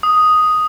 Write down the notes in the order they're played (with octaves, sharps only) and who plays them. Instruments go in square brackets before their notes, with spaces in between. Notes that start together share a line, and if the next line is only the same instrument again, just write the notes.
[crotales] D#6